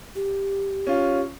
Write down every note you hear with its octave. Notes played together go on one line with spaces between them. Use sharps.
G4
C#4 F4